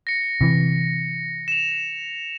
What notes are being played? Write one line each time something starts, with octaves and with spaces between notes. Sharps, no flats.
A#6 C#7
C3 E3
E7 F7